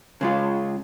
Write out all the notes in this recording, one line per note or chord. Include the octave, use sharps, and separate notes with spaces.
C#3 G#3 F4